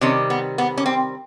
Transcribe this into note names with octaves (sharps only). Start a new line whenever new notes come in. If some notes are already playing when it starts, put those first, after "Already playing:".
C3 D#3 G3 C#4
B3
B3
C#4
C4